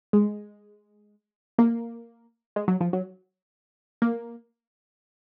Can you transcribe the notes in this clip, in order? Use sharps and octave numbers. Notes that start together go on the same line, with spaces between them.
G#3
A#3
G#3
F#3
F3
F#3
A#3